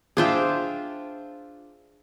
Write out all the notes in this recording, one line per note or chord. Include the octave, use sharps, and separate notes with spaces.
D4 F4 G#4 C5 E5 G5